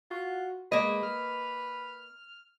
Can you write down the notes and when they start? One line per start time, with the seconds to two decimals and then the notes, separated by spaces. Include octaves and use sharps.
0.11 F4 F#4
0.72 G#3 A#3 B4 D#5
1.03 F6